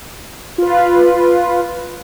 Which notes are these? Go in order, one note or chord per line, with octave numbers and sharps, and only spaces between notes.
F4 B4